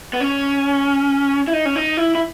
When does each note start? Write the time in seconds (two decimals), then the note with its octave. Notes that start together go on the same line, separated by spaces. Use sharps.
0.13 B3
0.20 C#4
1.48 E4
1.53 D#4
1.65 C#4
1.76 D#4
1.97 E4
2.15 E4